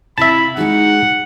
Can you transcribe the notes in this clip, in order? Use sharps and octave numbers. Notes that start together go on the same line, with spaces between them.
C3 E4 E5 F5 A5 B5
G#3 D#4 F#4 G#4 F#5